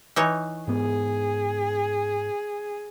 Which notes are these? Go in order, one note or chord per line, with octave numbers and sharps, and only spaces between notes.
E3 D#4 C#5
G#2 B3 G#4